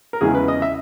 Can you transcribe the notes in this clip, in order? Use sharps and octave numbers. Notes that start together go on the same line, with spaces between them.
A#4
E2 C#3 E3 G#3 G#4
B4
D#5
E5